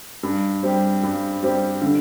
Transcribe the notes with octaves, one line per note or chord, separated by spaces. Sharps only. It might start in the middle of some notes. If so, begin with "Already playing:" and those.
G2
G3 C4 G4
G2
G3 C4 G4
D3